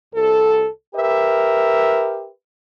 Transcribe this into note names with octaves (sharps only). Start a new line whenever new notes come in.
C2 A4
G4 A#4 B4 E5